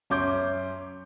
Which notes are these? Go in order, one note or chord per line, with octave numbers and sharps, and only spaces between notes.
F#2 C#4 E5 C6 D6 G6